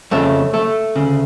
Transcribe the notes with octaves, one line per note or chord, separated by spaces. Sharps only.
F2 C#3 A3
A3
D2 C#3